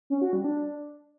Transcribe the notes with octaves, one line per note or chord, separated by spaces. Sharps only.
C#4
F#4
G3
D4